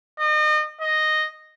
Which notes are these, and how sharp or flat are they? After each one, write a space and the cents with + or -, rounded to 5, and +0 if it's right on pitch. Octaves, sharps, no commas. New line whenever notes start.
D#5 -35
D#5 -5